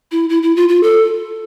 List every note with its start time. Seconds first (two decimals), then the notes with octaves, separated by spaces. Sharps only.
0.12 E4
0.30 E4
0.43 E4
0.56 F4
0.69 F4
0.83 A4